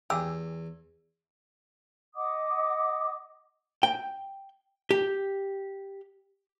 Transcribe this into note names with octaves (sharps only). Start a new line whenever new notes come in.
E2 G4 G#4 E6
D#5 F#5 D6 D#6
G5
G4